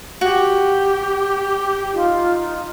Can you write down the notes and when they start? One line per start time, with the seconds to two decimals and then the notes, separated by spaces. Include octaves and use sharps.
0.21 F#4 G4
1.93 D#4 F4